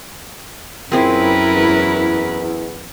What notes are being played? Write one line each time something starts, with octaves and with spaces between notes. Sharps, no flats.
F#2 A#2 C4 E4 G#4 A#4 B4
E2